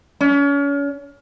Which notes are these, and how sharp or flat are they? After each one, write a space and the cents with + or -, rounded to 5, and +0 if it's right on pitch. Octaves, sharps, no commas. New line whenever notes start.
C#4 +35